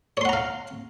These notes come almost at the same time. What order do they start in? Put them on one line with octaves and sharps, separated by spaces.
C#5 C6 F#5 A#5 F5